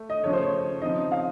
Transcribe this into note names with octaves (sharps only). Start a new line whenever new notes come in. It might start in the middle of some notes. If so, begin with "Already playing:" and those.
Already playing: A3
D#5
C#3 F3 A3 C#5
C5
C#5
C#3 F3 C4 D#4 D#5
F5